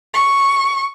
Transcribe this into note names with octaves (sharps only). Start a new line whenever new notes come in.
C#6